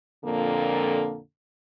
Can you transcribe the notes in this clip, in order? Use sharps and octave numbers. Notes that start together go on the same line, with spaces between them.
F2 A#2 D3 A#3 A4